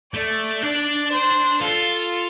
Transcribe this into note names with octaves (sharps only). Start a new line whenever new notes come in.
A3 D5
D4 D5
C5
F4 A4